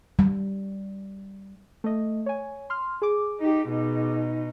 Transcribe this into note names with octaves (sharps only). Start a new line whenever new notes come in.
G3
A3 D#5
C#5 G#5
C6 F6
G#4 D6
D#4 G4
B2 D#4